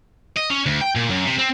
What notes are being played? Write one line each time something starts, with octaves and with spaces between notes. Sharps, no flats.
D#5
C#4
D2
G5
A#2
F#2
C3
C4